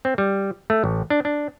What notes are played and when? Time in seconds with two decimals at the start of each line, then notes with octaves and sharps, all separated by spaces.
0.05 C4
0.18 G3
0.70 A3
0.84 A1
1.10 D4
1.25 D4